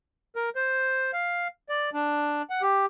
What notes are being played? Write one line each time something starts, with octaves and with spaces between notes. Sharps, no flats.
A#4
C5
F5
D5
D4
F#5
G4